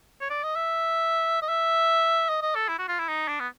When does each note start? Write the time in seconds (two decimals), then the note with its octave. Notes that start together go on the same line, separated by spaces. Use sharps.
0.21 C#5
0.30 D5
0.43 D#5
0.56 E5
1.42 D#5
1.49 E5
2.29 D#5
2.42 D#5
2.55 A4
2.68 E4
2.79 F#4
2.88 F4
2.99 E4
3.08 D#4
3.28 D4
3.40 B3